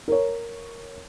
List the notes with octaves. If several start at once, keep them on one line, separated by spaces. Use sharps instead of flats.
A#4 C#5